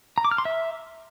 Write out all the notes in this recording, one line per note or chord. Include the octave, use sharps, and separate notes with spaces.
A#5
D6
F6
C6
E5